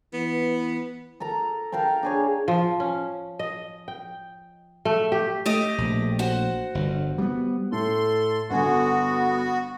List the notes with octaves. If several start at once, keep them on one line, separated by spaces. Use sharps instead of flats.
E3 B3
A4 A#4 A#5
A#4 F5 G5 A5
D4 G#4 C#5
F3
C#4
D#5
G5
A3
G4
A3 G4 D#5
A#1
F#4 C5 F#5
G1
G3 G#3 B3
A2 A4 C6
G1 D3 B3 F#4 G#5